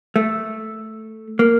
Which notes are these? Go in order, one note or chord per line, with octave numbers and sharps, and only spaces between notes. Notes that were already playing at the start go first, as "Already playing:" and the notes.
A3
A#3